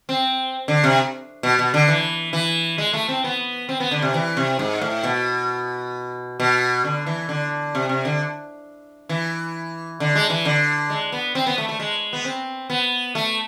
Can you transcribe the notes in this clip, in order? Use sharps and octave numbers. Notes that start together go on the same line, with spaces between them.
C4
D3
C3
B2
B2
D3
E3
E3
G#3
A3
C4
B3
C4
B3
D3
C3
E3
C3
G#2
A2
B2
B2
D3
E3
D3
C3
C3
D3
E3
D3
G#3
E3
D3
G#3
B3
C4
B3
A3
A3
G#3
B3
C4
B3
A3